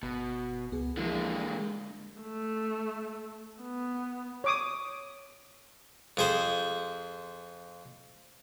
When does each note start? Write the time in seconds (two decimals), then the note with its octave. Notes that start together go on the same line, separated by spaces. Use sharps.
0.03 G1 B2
0.72 C#2 B3 G#4
0.97 D3 E3 F3 G#3 A#3 E4
1.59 G#3
2.23 A3
3.63 B3
4.44 C#5 D6 D#6
6.17 F2 G#4 C5